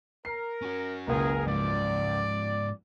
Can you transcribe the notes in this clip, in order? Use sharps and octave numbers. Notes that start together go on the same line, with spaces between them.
A#4 C7
C#4 F#4
F#1 C#2 G#4 A#4
G#2 F3 D5